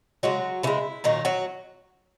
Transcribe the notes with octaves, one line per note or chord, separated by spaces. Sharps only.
C#3 F#3 G#3 F#4
C#3 E3 G#3 E4
A#2 D#3 F#3 D#4
F#3 F#4